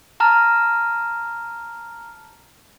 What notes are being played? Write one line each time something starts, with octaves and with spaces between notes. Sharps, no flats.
A5 A#5 F6